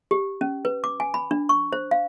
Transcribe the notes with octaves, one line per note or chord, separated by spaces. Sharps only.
G4
C#4
B4
D6
G#5
B5
D4
C#6
C5
F5